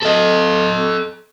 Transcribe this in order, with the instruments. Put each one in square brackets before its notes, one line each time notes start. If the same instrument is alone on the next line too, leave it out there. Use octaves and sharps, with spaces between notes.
[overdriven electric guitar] A4 D#5